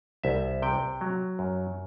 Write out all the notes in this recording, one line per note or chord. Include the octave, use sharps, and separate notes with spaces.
C2 E5
C3 G5
F#3
F#2